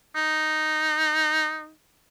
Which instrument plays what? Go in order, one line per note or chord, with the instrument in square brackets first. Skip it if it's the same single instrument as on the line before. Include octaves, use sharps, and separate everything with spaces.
[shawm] D#4